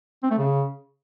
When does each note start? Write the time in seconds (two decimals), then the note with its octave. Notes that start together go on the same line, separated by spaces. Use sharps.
0.23 C4
0.31 A3
0.38 C#3